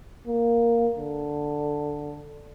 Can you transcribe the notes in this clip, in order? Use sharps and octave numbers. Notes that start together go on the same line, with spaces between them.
A#3
D3